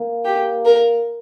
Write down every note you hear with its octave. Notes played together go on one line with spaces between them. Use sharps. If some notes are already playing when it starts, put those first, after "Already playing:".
Already playing: A#3
G4
A#4